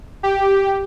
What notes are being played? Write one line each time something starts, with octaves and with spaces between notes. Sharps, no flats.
G4